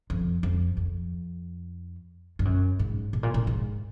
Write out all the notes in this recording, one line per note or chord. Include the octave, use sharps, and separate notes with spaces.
F2
F2
F2
G2
F#2
G#2
A2
A#2
A2
G#2